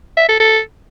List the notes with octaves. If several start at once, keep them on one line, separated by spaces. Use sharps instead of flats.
E5
A4
A4